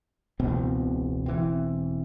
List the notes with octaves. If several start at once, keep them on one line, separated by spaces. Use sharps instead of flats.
E1 C#2 B2 C4
E1 E3 C4